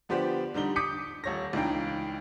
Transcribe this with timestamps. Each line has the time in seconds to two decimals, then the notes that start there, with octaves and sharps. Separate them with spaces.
0.09 D3 F3 B3 G4 C5 D5
0.54 D3 G3 D#4 G7
0.76 D6 D#6 G6 B6 C#7
1.24 D#1 C#5 A#6
1.53 C#2 E3 D4 D#4 F5 G5